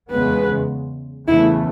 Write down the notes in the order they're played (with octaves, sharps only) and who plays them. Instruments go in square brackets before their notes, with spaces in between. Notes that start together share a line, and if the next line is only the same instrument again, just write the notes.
[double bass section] E2 C#3 G#3 B3 [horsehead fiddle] B4
[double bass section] E2 C#3 E3 A3 [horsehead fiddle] E4